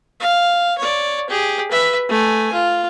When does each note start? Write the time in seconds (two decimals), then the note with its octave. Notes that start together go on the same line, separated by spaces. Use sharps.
0.20 F5
0.78 C#5 D5
1.29 G4 G#4
1.71 B4 E5
2.09 A3 G#5
2.53 F4